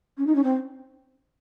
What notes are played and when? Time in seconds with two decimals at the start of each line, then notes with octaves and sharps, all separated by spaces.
0.18 C#4
0.26 D#4
0.35 C#4
0.43 C4